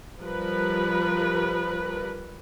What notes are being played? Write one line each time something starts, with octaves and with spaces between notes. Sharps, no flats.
F3 G3 A#4 B4